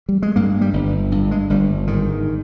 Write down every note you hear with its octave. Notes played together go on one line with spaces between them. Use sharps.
G3
G#3
G2 A#3
G3
G1
G2
G#3
G1 G3
G#2 D#3